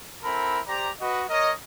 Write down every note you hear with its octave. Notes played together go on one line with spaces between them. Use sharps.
C4 E4 A4 A#4 B5
G4 C5 D5 A#5
F#4 B4 D#5
A#4 C#5 D#5